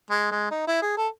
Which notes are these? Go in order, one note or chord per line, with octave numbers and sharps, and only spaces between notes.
G#3
G#3
D#4
E4
G#4
A4